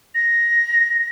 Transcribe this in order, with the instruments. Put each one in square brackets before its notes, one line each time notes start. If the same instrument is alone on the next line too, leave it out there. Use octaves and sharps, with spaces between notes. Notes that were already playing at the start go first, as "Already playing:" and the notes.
[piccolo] A#6